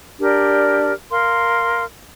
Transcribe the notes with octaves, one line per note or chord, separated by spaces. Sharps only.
D4 G4 A#4 D5
A#4 F5 C6